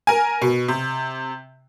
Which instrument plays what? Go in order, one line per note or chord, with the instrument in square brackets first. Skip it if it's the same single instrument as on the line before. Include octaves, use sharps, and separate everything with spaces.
[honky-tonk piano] A#4 G#5
B2
C3